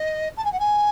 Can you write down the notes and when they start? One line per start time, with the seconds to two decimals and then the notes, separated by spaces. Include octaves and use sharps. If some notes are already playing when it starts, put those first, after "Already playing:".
Already playing: D#5
0.37 A5
0.44 G#5
0.52 F#5
0.60 G#5